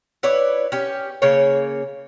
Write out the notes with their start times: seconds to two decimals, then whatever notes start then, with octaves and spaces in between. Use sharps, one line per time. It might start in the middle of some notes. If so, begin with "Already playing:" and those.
0.23 E4 B4 C#5 D5
0.72 C#4 G4
1.22 C#3 A#3 C#5